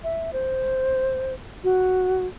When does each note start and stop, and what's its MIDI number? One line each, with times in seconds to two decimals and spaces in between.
0.04 0.33 76
0.33 1.34 72
1.64 2.26 66